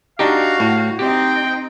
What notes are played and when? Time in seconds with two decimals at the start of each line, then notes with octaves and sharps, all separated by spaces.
0.19 D4 D#4 F#4 G4 F5
0.60 A2
0.99 C4 D#4 G4 G5